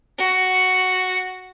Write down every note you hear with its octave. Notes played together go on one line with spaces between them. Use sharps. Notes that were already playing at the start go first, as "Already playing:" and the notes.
F#4